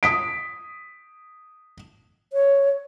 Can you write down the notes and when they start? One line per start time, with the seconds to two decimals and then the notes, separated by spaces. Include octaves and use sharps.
0.03 D#6 B6 D7
2.33 C#5